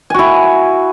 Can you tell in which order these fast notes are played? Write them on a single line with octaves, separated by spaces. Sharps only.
G#5 F#4 E4